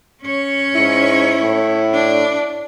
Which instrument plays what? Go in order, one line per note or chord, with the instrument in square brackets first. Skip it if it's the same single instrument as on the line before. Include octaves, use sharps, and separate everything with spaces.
[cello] C#4 C#5
[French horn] G#2 [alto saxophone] E4
[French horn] A2
[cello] D4